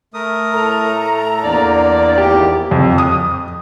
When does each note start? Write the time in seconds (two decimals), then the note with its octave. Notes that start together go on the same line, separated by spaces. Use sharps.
0.14 A3 A#4 D#6
0.53 A2 A4 A#5
1.44 E2 A#3 D4 D5
2.17 G#1 E4 G4
2.71 F2
2.98 D#6